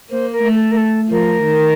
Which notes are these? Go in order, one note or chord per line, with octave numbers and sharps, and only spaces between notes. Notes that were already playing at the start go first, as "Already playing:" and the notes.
A#3 C5
A#4
A3
A4
A#4
A4
F3 A#4
D#3